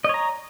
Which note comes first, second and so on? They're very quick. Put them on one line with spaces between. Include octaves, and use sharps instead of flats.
D#5 C#5 A#5